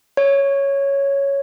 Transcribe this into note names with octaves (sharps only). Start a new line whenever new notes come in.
C#5